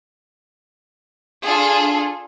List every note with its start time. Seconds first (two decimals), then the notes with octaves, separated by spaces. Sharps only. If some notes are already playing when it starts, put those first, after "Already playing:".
1.43 D4 F4 G#4 A4